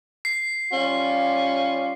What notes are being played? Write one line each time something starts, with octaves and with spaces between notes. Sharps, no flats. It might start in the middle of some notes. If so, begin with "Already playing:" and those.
C7
G3 C#4 F4